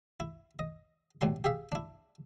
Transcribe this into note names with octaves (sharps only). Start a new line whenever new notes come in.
E4
D#5
B1 A2 G3 C6
G4 G#4 E5 F5
D4 E4